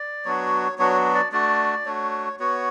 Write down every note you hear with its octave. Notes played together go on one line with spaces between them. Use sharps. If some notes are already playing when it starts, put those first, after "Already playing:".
Already playing: D5
F#3 B3 D4 F#4 C#5
F#3 B3 D4 F#4 C#5
D5
A3 D4 F#4 D5
A3 D4 F#4 C#5
B3 F#4 C#5